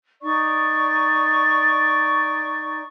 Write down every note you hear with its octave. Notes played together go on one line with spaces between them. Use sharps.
D#4 D5 C#6